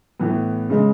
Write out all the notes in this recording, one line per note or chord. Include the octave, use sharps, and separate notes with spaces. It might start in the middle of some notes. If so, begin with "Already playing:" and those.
A2 E3 B3
C#3 G#3